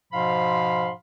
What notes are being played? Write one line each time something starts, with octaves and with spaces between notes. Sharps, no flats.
G#2 B2 F3 F5 B5 C6